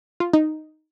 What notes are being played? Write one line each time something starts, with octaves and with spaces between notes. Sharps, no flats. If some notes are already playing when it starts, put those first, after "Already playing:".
F4
D#4